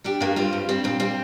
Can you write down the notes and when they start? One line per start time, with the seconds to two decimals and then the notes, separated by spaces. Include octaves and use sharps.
0.04 G3 D4 G4
0.20 G2 A#3 D4
0.36 G3 C4 F4
0.53 G2
0.69 G3 C4
0.84 A#2 C4
1.00 G3 C4